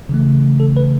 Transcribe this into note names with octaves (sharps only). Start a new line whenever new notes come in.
C#3 E3 A3
A4
B4